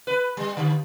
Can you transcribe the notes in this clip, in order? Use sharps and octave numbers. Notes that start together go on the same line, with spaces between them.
B4
G3
D3